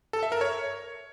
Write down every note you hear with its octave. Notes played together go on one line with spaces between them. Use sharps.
A4
E5
A#4
C#5